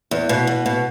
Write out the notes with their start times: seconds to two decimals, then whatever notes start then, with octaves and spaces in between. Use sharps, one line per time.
0.11 E2
0.29 B2
0.47 B2
0.66 B2